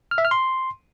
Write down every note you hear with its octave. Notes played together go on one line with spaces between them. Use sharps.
F6
E5
F6
C6